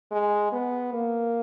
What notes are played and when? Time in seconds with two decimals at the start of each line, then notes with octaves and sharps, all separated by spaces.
0.12 G#3
0.52 B3
0.93 A#3